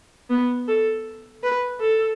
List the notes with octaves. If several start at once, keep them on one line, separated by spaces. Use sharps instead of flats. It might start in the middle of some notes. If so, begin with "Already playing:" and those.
B3
A4
B4
A4